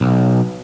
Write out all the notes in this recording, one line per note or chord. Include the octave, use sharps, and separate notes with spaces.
B1